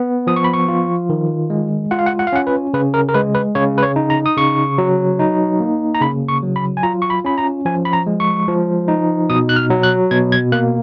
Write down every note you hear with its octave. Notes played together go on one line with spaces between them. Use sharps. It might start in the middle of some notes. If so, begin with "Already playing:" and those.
Already playing: B3
F3 D#6
C#6
B5
C#6
F4
D#3
G#3
F4 F#5
F5
F#5
F#5
F5
C#4 F#5
B4
C#3 B4
A#4
A#4
G#3 B4
B4
C#3 C#5
B4
C#5
D#4
A#5
D#6
C#3 C#6
F#3
D#4
A#3
A#5
C#3 B5
C#6
F#3
B5
G#5
F4 A#5
C#6
B5
C#4 B5
A#5
F3 G#5
B5
A#5
G#3
C#6
F3
D#4
B2 D#6
F#6
F6
F#3
F#6
B2 G#6
G#6
A#3 F#6